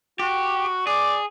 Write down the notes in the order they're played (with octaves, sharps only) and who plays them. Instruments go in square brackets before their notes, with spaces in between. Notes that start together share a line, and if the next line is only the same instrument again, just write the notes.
[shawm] F#4 [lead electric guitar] G4
[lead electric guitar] G#4 [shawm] D5